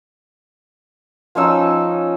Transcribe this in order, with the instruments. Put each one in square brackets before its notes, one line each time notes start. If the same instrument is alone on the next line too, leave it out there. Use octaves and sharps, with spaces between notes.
[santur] F3 C#4 D#4 E6